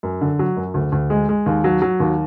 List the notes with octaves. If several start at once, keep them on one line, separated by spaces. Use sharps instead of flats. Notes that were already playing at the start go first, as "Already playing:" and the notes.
F#2
D3
F#3
F#2
D2
D2
G#3
G#3
D#2
F#3
F#3
D#2